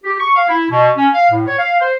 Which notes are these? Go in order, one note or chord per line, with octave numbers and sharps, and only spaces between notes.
G4
C#6
F5
E4
B2
C#4
F5
A2
C#5
F5
C5